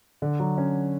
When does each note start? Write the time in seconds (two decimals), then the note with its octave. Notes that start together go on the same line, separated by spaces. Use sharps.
0.22 D3
0.40 F#3
0.58 C#4